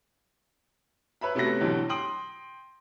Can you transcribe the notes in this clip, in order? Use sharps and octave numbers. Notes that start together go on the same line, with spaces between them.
B4 C#5 E5 B5
C3 A3 B3 C#4 F#4 A#6
B2 D3 E3 F#3 G3 C4
G5 C6 D#6 F#7